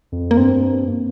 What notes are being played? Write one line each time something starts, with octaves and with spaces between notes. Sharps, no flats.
F2
A#3
G2 C4
A#3